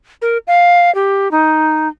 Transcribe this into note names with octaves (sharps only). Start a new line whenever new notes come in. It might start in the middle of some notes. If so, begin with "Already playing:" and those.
A#4
F5
G4
D#4